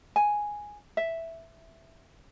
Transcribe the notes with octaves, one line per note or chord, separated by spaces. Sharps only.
G#5
E5